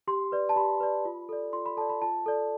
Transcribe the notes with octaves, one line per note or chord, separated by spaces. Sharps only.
G4 C6
B4 D5
A5
G4 B5
B4 D5
F4
A4 D5
F4 C6
B5
A4 D5 A5
B5
F4 A5
A4 D5